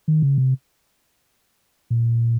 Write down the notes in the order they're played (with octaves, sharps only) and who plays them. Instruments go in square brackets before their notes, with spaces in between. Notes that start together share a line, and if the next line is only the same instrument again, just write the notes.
[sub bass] D#3
C#3
C3
A#2